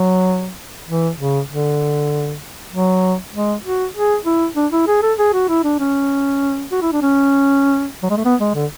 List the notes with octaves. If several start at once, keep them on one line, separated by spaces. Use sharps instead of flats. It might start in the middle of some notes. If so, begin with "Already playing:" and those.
Already playing: F#3
E3
C#3
D3
F#3
G#3
F#4
G#4
E4
D4
E4
G#4
A4
G#4
F#4
E4
D4
C#4
F#4
E4
D4
C#4
F#3
G#3
A3
B3
G#3
D3